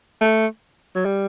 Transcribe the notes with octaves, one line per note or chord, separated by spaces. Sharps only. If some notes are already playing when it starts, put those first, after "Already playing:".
A3
F#3
G3